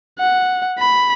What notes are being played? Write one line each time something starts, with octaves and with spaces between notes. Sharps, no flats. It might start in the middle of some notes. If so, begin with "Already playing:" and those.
F#5
B5